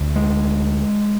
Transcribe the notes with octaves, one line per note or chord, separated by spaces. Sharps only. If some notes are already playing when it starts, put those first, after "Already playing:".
Already playing: D2 D3
G#3